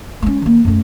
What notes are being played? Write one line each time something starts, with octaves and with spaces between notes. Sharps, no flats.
G#3 C#4
D#3 A#3
F#2 A3